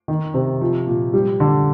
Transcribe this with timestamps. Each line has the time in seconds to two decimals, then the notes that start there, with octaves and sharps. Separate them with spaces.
0.08 D#3
0.34 C3
0.61 F3
0.87 A#2
1.13 G3
1.40 D3